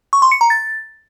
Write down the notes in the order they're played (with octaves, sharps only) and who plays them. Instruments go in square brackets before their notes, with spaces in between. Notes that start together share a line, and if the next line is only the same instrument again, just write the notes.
[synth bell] C#6
C6
C#7
A#5
A6